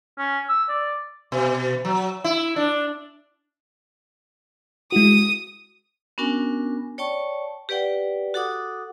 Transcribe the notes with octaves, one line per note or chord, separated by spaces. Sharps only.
C#4
E6
D5
B2
F#3
E4
D4
G#3 E4 F#4 D#6
B3 C#4 D4 F#4 A#4 G#5
C#5 D5 G5 A5 C#6
G4 B4 D5 F#5 G5
F#4 A4 F#5 D6 D#6